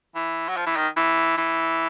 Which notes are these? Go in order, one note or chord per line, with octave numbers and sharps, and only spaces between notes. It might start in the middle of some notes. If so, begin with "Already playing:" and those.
E3
F#3
F3
E3
D#3
E3
E3